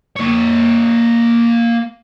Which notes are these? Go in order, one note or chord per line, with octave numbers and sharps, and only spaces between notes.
A#3 C#5